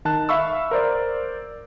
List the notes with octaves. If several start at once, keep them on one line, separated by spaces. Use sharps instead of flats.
D#3 A5 F#6
E5 F5 B5 C#6 E6
A#4 C5 D5